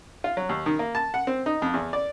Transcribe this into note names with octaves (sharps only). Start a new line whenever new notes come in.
F4
F#3
D#2
D#3
A#3
A5
F#5
C4
D#4
F2
E2
D5